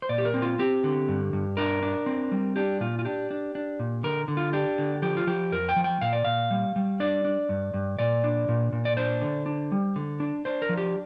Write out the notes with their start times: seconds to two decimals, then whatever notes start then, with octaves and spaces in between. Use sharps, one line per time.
0.02 C5
0.09 A#2 D5
0.18 G4
0.25 A#4
0.34 C4
0.42 F4
0.59 C4 G4
0.84 D3
1.08 G2
1.33 G2
1.57 D4 A#4
1.83 D4
2.06 C4
2.32 G3
2.56 D4 G4
2.80 A#2 F4
2.99 F4
3.05 D4 G4
3.31 D4
3.55 D4
3.79 A#2
4.03 D3 A#4
4.28 D3
4.37 F4
4.53 D4 G4
4.78 D3
5.02 F3 G4
5.17 F4
5.27 F3 G4
5.52 F2 A#4
5.69 G5
5.76 F3
5.84 G5
6.01 A#2 F5
6.13 D5
6.25 A#2 F5
6.51 G3
6.76 G3
7.00 D4 D5
7.25 D4
7.49 G2
7.74 G2
7.99 A#2 D5
8.24 D4
8.48 A#2
8.72 A#2
8.85 D5
8.97 D4 C5
9.22 D3
9.46 D4
9.72 G3
9.96 D3
10.20 D4
10.45 D4 C5
10.62 A#4
10.69 F3
10.77 G4